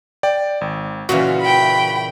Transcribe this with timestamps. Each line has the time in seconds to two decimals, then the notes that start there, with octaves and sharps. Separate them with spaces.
0.23 D5 G5
0.61 G#1
1.09 A#2 C#3 E3 F#4
1.41 G5 B5